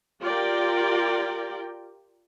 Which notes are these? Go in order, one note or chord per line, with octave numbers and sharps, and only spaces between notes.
F4 G4 A#4 D5 G5